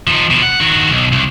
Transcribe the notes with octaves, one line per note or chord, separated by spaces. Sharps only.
F3 D#4
B2 F3
F#5
D#3 F#4
B1
C2